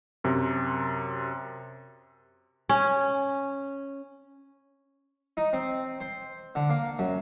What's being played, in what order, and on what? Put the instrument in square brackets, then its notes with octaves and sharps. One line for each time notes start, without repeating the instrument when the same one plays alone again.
[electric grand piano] F#2 C3
[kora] C#4
[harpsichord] D#4
C4
C5
D3
A#3
F#2